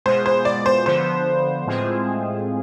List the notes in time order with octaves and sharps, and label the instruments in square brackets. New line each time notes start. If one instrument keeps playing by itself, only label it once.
[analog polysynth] B2 G#3 B3 F4 G#4 [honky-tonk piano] C5
[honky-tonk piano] C5
D5
C5
[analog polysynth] D3 F3 B3 [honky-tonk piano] C5
[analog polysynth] A2 G#3 C4 F4 G#4